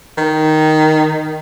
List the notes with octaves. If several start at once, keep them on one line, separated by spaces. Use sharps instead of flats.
D#3